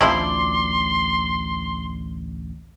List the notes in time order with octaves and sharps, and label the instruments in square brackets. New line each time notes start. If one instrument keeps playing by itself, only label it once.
[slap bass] A1 D2 [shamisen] F3 C4 E4 [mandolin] D5 [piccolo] C6